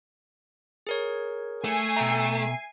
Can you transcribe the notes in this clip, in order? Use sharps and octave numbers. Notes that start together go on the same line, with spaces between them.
G#4 A#4 C#5
A3 G#5 C7
B2 E5 G5 A#5 E6